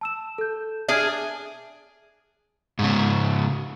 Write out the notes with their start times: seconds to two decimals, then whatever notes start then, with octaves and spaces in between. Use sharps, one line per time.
0.01 A5 E6 E7
0.38 A4 G6
0.89 D4 G#4 E5 F6 G#6
2.79 G#2 C#3